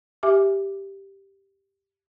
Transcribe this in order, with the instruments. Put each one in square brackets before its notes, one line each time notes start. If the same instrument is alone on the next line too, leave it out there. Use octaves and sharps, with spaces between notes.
[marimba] G4 E5 G#5 D6